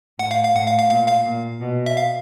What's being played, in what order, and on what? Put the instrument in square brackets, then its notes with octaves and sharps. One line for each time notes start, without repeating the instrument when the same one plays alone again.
[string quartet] A2 [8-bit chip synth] F#5
[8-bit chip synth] F5
F5
[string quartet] A2 [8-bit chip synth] F#5
[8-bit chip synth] F5
F5
[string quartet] A#2 [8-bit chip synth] F5
[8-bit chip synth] F5
[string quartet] A#2
B2
[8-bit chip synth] E5
F5